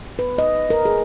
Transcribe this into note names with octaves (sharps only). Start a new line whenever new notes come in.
B4
D#5
A#4
G#4